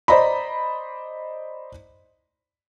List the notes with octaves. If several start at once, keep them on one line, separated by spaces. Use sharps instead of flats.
C5 D5 D#5 A#5 B5